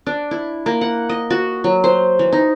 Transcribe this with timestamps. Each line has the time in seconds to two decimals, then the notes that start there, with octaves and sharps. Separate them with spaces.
0.07 D4
0.31 E4
0.66 A#3
0.81 F#5
1.09 D#5
1.30 F#4
1.64 F#3
1.84 C5
2.19 E3
2.33 D#4